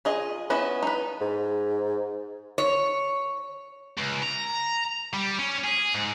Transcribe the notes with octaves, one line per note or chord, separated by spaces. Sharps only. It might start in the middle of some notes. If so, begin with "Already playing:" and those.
F4 G#4 D#5
B3 C#4 E4 D#5
D#4 B4
G#2
C#5
C#2
A#5
G3
C#4
G#4
G#2